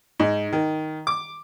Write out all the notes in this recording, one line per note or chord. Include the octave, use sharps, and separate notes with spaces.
G#2
D#3
D6